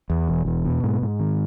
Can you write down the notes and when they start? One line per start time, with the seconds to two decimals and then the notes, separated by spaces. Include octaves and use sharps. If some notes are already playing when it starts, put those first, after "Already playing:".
0.10 E2
0.28 E1
0.46 E2
0.65 B2
0.84 G#2
1.02 G#2
1.20 D#3